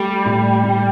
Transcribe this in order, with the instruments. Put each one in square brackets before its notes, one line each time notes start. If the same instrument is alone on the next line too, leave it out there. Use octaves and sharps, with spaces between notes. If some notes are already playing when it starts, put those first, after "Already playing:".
Already playing: [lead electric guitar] G3 [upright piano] A3
[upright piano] A2
A2